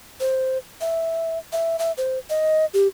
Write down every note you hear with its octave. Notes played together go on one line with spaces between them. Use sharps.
C5
E5
E5
E5
C5
D#5
G4